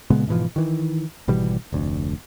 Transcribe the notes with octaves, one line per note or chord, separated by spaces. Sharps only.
A#2 C#3 G#3 B3
G#2 B2 E3 F3
D#3 E3
G#1 B2 E3 G3
F1 D2